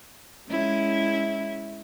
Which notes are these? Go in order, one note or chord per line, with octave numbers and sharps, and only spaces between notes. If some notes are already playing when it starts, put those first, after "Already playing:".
G#3 C#4 E4